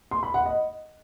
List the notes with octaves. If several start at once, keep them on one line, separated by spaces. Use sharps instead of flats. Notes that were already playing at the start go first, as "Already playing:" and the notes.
C6
B5
F#5
D#5